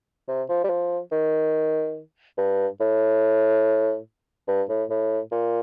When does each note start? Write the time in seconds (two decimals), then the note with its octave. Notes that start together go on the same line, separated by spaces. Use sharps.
0.28 C3
0.49 F3
0.64 G3
0.69 F3
1.12 D#3
2.38 G2
2.80 A2
4.48 G2
4.69 A2
4.90 A2
5.32 A#2